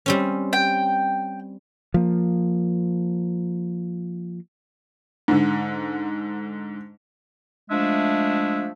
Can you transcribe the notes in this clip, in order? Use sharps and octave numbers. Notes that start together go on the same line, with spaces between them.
G3 C4 C#4
G5
F3 A#3
G#2 D3
F3 G#3 A3 D4 E5